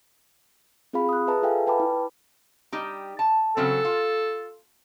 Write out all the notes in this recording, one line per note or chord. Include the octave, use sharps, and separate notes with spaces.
C4 F4 G#4 F5 B5
D#6 F#6
G#4 B4 E5 A5 A#5
F4 A4 E5 F5 G5 G#5
B4 G5 A5 B5 D6
E4
G3 D#4 G4
A5
C#3 F#3 C4 A4
F4